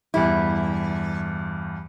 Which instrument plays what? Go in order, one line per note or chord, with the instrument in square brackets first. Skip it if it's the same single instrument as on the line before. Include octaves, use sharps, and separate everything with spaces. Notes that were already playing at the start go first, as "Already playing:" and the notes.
[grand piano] E2 G2 G3 [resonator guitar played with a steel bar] E4